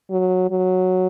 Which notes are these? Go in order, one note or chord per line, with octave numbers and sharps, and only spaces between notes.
F#3
F#3